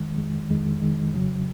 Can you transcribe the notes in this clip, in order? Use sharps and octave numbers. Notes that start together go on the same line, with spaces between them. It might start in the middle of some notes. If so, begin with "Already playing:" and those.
Already playing: F2 D#3 G#3
F2 D#3 G#3
F2 D#3 G#3
F2 D#3 G#3
F2 C#3 F#3